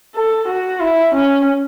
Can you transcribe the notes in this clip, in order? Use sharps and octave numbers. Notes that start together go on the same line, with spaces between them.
A4
F#4
E4
C#4